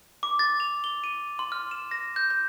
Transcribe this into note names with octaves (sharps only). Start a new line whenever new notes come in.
D6
A6
F7
G7
D#7
C6
F6
E7
A#6
G6
G6